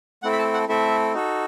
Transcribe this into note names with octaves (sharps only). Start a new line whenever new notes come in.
A3 C4 E4 A4 F#5
B5
A5
F#5
A3 C4 E4 A4 E5
D#4 F#4 A4